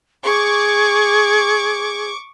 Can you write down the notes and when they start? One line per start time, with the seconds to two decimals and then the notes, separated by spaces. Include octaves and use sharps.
0.25 G#4 C#6 D6